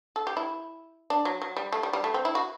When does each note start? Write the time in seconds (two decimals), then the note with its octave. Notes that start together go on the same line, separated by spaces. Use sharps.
0.16 A4
0.27 G4
0.37 E4
1.10 D4
1.25 F#3
1.42 F#3
1.57 G3
1.72 A3
1.83 G3
1.93 G3
2.04 A3
2.14 C4
2.25 E4
2.35 F#4